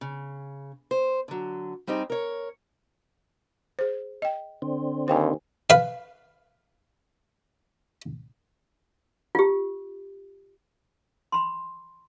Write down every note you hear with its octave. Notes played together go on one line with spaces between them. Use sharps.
C#3
C5
D3 F#3
G3 C4 D#4 G4 G#4
A#4 C#5
G#4 C5
D#5 G5
D3 C4
D#2 C5 G5 G#5
B4 F5
F4 G4
B5 C6